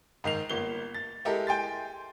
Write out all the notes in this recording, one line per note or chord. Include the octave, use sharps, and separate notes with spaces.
G#2 D#3 C7 F7
G1 A#3 G7
A6
G#3 E4 G4 A4 A#4
G5 G#5 C6 A6